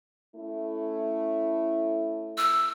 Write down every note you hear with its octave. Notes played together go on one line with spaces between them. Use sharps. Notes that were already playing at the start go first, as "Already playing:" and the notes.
A3 C#4 E4
E6